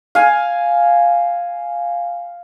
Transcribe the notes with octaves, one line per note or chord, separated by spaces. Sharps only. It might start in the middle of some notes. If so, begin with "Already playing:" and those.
F5 G#5